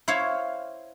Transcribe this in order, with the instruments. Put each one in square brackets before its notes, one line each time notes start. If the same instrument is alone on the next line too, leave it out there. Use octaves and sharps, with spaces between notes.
[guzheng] E4 C5 C#5 F5